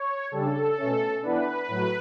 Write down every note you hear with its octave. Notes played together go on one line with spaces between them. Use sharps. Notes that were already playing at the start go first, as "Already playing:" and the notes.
Already playing: C#5
C#3 G3 D4 A4
B2 A3 C#4
E3 B3 D4 B4
A2 F#3